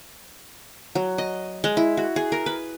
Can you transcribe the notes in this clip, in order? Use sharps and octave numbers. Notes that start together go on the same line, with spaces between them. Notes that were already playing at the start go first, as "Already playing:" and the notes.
F#3
D#5
G#3
E4
F#4
G#4
A#4
B4